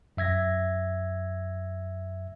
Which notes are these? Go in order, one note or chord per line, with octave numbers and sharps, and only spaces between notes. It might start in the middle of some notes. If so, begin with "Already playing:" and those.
F#2 E5 G#6 A#6